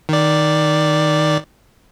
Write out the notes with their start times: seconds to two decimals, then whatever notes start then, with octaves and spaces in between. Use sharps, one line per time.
0.09 D#3 D5